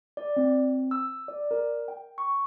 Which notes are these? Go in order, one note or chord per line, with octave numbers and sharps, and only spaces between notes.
D5
C4
E6
D5
A#4
G5
C#6